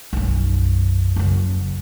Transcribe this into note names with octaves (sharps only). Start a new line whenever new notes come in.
B1 F#2
F#1 F#2